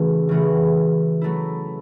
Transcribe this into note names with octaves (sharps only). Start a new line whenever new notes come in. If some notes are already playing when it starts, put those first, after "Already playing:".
Already playing: C#3 E3 A3 C#4 F#4
C#3 E3 A3 C#4 F#4
F#3 A3 E4